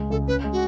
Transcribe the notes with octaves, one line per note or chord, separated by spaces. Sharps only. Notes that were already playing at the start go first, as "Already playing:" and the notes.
Already playing: C#2 G#3
C#2 A4
C#4 B4
G#3
F#4